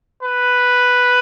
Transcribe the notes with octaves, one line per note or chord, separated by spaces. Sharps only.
B4